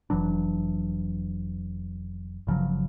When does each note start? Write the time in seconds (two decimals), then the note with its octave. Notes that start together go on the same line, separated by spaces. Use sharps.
0.10 F1 E3 F#3 D4
2.47 G1 C#3 F3 F#3